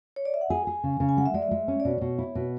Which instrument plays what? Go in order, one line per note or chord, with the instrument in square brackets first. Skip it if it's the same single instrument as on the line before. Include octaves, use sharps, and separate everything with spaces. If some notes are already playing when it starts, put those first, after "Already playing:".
[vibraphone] C#5
D5
E5
F#5
[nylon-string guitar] G#4 [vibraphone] G#5
[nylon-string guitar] G#4
C#3
C#3
[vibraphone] G#5
[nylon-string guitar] G#3 [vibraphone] F#5
[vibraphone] E5
[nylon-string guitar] G#3 [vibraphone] D5
[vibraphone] E5
[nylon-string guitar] G#3
C#4
[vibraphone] D5
[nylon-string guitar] B2 [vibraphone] C#5
[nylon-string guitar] B2
E4
B2